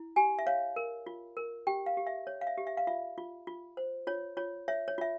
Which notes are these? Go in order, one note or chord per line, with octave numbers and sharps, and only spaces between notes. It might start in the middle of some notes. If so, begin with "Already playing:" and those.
Already playing: E4
G4 G#5
E5
C#5 F5
A#4
F4
A#4
G4 G5
F5
G4
E5
C#5
F5
E5
G4
E5
F5
F4 E5
F4
F4
C5
F4 C#5
F4 C#5
C#5 E5
C#5
F4 E5